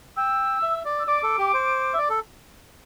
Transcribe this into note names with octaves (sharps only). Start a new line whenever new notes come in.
G5 E6
E5
D5
E6
D5 D6
A4
G4
C5
E5
D5
A4